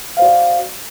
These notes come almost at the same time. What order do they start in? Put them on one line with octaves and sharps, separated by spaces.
F5 C5 F#4 D5